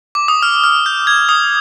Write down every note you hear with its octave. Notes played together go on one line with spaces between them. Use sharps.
D6
D#6
F6
F6
G6
G#6
D#6